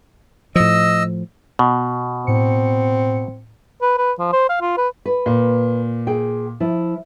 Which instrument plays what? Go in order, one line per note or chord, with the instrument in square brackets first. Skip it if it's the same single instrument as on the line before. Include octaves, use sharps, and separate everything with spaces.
[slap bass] A2 F3 [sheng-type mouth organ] D#5 E6
[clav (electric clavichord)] B2
[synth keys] A2 C#7 [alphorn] C4
[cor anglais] B4
B4
F3
C5
F5
F4
B4
[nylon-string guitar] B4
[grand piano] A#2
[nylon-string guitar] G#4 G5
F3 E4